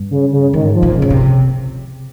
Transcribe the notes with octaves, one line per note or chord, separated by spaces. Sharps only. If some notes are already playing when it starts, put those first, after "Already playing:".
Already playing: G2
C#3
C#3
G#2 D#3
F3
A#2
A#2 C#3
C3